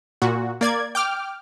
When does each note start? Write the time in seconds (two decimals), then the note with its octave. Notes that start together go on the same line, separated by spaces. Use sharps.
0.22 A#2 F#4
0.61 A#3 D5 G#6
0.95 G5 D6 F6